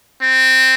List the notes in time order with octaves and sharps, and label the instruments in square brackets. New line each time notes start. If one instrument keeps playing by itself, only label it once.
[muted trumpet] C4